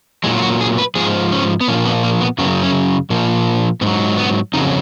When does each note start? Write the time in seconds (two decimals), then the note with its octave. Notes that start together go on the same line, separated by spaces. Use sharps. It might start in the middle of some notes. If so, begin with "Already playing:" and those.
0.24 A#2 F#3 G#3
0.38 F4
0.42 F#4
0.61 G#4
0.78 B4
0.95 G#2 F3 G#4
1.32 C#4
1.61 B3
1.68 A#2 F3 C#4
1.85 B3
2.03 A#3
2.21 B3
2.38 F#2 C#3 F#3 B3
2.63 C#4
3.10 A#2 F3
3.81 G#2 B3
3.86 F#3
4.18 B3
4.53 F2 C#3 F#3 D#4